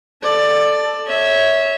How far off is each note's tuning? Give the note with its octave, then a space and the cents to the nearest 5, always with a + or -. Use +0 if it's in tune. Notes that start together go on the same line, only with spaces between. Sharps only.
A4 +0 D5 +15
C#5 +0 E5 -20